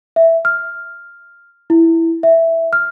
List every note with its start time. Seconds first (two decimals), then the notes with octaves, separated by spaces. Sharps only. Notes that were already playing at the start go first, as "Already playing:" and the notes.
0.16 E5
0.45 F6
1.70 E4
2.23 E5
2.73 F6